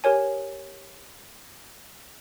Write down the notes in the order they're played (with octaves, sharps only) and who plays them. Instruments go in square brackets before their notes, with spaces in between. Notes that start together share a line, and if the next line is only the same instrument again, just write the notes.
[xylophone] G4 A#4 C#5 G#5